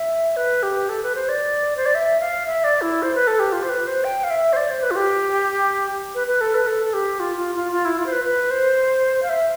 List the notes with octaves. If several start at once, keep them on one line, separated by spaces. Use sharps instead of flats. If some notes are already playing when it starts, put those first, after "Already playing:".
Already playing: E5
B4
G4
A4
B4
C5
D5
C5
D5
E5
F5
E5
D5
E4
C5
B4
A4
G4
F4
C5
B4
C5
G5
F5
E5
C5
D5
C5
B4
F4
G4
B4
B4
A4
B4
A4
A4
G4
F4
F4
F4
F4
E4
F4
C5
B4
B4
C5
F5
E5